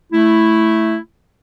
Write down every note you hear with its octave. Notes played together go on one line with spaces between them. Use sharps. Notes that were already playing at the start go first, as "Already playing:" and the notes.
A3 E4